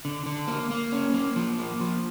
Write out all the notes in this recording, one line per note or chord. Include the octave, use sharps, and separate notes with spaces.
D3
D3
A#3
A#3
C#4
A#3
F3
A#3
F3